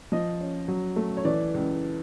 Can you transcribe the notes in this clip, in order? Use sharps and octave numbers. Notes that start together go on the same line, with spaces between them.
F3 D#5
C#4
F#3
A3
C#5
E3 D5
C#2